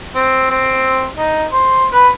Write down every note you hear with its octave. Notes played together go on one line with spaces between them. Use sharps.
C4
C4
D#4
C5
B4